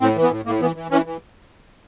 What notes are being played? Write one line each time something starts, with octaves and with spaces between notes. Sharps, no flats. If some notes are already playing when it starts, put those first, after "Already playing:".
A2 C4
E3
B3
A2
A2 A#3
E3 B3
E3
E3 C#4
E3